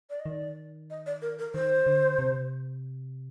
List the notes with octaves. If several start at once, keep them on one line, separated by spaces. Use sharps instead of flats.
D5
D#5
D#3 D5
D#5
D5
A#4
A#4
D#3 C5
D3
C3